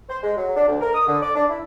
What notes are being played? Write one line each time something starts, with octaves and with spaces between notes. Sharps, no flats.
C5
G#3
F#3
D4
D2
A#4
D#6
D3
D5
D4
E4